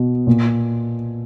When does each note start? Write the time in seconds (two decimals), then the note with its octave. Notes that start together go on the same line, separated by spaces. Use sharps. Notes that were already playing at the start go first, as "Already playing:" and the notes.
Already playing: B2
0.27 A#2